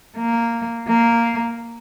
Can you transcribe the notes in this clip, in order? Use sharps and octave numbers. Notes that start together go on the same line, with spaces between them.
A#3
A#3